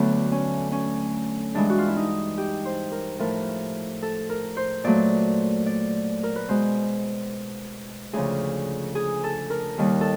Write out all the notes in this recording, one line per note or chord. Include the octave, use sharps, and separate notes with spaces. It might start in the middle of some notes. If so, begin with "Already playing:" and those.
Already playing: D2 D3 F#3 A3 B3
C#4
C#4
G2 E3 G#3 D4
F#4
F4
E4
D#4
G4
C5
A#4
A2 F3 A3 A#4
A4
A#4
C5
A#2 F#3 A3 D5
D5
A#4
B4
B2 G#3 C5
D2 C#3 F3 G#4
G#4
A4
A#4
D#2 D#3 G3
A4